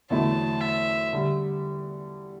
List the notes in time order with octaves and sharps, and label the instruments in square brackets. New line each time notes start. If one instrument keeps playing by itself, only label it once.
[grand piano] E2 D3 F#3 A3 E4 [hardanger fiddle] A5
[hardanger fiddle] E5
[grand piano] D3 G3